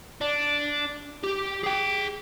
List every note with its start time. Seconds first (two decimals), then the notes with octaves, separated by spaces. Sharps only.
0.21 D4
1.24 G4
1.64 G#4 G5